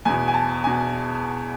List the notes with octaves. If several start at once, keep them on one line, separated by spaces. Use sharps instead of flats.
E2 B2 G#5
G#5
A5
B2 G#5